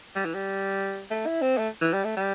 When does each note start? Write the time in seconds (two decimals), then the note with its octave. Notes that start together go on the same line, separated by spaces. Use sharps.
0.16 G3
0.25 E3
0.34 G3
1.10 A3
1.26 E4
1.42 C4
1.57 A3
1.81 E3
1.93 G3
2.04 A3
2.17 G3